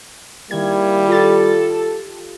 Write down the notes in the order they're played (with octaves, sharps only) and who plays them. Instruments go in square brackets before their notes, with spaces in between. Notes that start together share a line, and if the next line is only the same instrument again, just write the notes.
[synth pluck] D#3 G#6 [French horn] G3 [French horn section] A#3 E4
[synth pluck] F4 G4 A6 [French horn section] A4